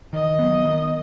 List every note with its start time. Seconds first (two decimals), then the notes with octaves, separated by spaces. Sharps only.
0.13 D#3 D#5
0.39 F#3 B3
0.65 D#3